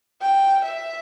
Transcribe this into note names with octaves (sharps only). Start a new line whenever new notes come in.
G5
E5